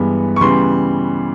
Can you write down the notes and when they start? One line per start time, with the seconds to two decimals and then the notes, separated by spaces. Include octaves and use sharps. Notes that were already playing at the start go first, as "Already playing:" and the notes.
Already playing: G2 E3 G#3 B3
0.36 C#6
0.41 C#3 E3 G3 B3 C6